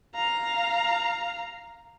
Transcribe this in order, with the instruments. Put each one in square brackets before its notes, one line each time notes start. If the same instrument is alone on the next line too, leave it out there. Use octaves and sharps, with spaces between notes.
[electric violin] F5 A#5